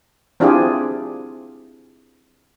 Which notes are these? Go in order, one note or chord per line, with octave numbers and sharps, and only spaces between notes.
C4 D4 E4 F4 G4 G#4